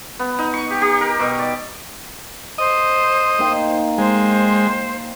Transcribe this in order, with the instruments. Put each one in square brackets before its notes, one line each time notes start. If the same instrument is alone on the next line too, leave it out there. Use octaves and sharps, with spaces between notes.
[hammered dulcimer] B3
D#4
C#6
G4
G4
A#4
B2
D5
[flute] C5 [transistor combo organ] D#5
[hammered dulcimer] A#3 D#4 G5
[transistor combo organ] G#3 [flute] C5